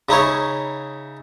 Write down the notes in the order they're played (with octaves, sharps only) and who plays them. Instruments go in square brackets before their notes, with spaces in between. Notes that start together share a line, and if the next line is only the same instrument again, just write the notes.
[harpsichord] C#3 D#4 E4 C#5